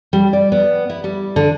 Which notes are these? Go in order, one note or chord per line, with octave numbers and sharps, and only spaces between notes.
G3
D5
B3
E4
G3
D3